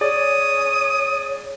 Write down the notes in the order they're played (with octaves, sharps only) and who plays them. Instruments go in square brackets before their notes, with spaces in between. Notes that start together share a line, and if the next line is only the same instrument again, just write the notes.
[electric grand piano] G#4 D5 [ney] C#5 [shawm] D#6